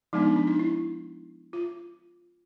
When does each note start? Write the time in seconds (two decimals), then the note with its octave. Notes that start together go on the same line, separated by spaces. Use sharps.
0.13 F3 G#3 B3 D4 D#4
0.23 D#4
0.36 D4
0.47 D#4
0.59 E4
1.53 F4